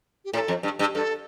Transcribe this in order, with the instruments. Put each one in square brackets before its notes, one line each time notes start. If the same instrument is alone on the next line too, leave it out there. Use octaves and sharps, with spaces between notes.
[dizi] G4
[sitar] A2 [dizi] A4
[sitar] F2
G2
G2
[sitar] G2 [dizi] A4